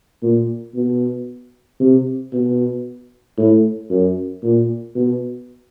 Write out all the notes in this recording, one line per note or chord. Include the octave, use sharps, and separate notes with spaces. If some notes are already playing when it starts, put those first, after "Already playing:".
A#2
B2
C3
B2
A2
F#2
A#2
B2